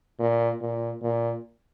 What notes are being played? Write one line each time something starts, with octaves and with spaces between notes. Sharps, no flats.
A#2
A#2
A#2